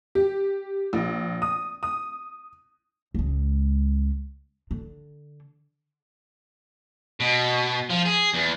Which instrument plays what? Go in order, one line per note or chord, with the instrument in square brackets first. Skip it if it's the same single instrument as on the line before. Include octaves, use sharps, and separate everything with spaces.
[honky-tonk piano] G4
A#1
D#6
D#6
[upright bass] C#2 G#3
D3
[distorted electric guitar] B2
F3
G#4
E2